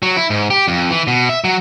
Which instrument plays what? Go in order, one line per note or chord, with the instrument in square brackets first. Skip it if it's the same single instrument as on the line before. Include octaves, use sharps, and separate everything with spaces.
[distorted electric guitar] F#3
E4
G#2
G4
F2
E3
B2
E5
F#3